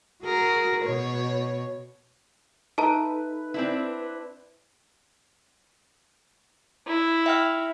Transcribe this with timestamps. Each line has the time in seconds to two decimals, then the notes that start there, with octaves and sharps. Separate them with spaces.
0.24 F#4 G#4 A#4
0.84 B2 C#5
2.78 D#4 A4 B4 E5 A5 A#5
3.54 C4 D4 E4
6.87 E4
7.26 E5 G5 F6